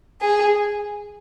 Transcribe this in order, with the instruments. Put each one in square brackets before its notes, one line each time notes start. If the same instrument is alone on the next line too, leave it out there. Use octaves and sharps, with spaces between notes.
[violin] G#4